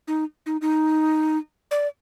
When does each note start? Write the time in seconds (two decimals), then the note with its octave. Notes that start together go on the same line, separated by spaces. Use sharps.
0.08 D#4
0.46 D#4
0.61 D#4
1.71 D5